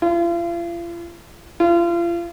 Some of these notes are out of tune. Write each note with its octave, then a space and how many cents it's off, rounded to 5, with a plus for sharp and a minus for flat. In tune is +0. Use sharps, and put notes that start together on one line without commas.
F4 -40
F4 -35